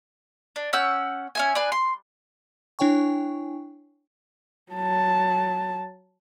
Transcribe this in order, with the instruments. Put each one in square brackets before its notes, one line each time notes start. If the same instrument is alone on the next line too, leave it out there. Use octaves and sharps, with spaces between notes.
[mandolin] D4
C#4 F#5 E6 G6
C#4 E5 G#5
D4 G#4 B4 G#5
C6
[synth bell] D4 E4 C#5 G5 G#5 C#6
[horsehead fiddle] F#3 A5